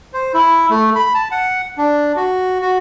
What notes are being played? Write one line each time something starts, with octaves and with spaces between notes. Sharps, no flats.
C5
E4
A3
B5
A5
F#5
D4
F#4
F#4